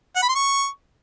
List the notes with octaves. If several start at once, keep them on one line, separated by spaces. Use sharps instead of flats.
F#5
B5
C6
C#6